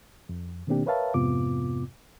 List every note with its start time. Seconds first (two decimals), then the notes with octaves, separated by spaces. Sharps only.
0.29 F2
0.67 B2 D#3 A#3 C4 D4 G4
0.86 A#4 B4 C#5 E5 F5 A5
1.14 F2 G#2 C3 B3 F4 D6